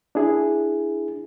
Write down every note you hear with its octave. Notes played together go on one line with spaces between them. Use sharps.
D4 E4 G#4